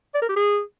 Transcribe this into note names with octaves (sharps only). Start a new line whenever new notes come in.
D5
A#4
G4
G#4